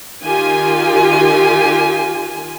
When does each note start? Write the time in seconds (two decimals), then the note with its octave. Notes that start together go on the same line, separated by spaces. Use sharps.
0.25 D#3 F4 G4 G#5